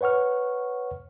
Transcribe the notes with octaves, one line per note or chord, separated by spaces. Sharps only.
B4 C#5 F#5 C#6 F6